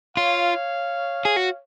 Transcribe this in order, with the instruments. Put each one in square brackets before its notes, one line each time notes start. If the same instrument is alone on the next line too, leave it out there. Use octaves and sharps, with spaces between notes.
[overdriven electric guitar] F4 [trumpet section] C#5 F5
[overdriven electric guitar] G#4
F#4